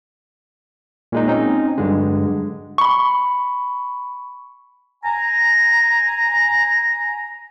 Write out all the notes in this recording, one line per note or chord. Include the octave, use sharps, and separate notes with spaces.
A#2 G#3 D#4
C4 C#4 D#4
G2 D3 F#3 G#3
B5 C#6
G#5 A#5